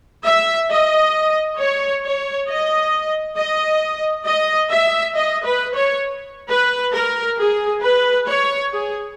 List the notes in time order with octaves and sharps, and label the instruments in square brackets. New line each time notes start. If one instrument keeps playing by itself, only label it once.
[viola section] E5
D#5
C#5
C#5
D#5
D#5
D#5
E5
D#5
B4
C#5
B4
A#4
G#4
B4
C#5
G#4